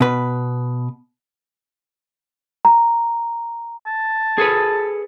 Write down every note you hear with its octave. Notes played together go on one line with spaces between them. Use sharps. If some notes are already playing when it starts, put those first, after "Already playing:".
B2 B4
A#5
A5
G#4 A4 B4